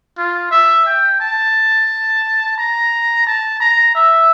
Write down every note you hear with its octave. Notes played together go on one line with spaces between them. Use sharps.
F4
E5
G5
A5
A#5
A5
A#5
E5